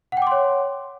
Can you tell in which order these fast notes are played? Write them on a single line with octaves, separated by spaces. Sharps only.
F#5 G5 D6 C6 C#5